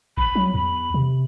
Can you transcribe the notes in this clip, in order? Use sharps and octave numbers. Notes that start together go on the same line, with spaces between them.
A#1 B5
F#3
E2 B5
C3